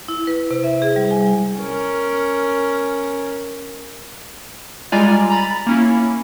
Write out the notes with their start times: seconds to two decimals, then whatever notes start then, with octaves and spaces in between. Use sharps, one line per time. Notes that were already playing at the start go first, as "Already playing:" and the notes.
0.08 E4
0.27 B4
0.51 C3
0.64 E5
0.82 G#4
0.96 G3
1.11 G#5
1.59 C#4 A#4
4.92 G3 G#3 F4 D5 G#5 A#5
5.30 A#5 B5 A6
5.67 A#3 C#4 E4